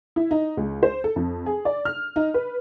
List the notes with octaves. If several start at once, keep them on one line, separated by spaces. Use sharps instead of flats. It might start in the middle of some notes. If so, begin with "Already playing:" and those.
E4
D#4
C#2
C5
A4
F2
G#4
D5
F6
D#4
B4